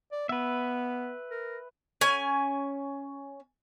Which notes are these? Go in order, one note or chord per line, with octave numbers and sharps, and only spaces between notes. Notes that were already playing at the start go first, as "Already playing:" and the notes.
D5
B3 B4 E5
A#4
C#4 G#5